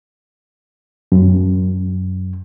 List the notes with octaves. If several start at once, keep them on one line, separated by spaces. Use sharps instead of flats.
F#2